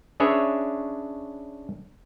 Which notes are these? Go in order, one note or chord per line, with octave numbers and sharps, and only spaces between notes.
C#4 D4 G#4 B4 C#5 E5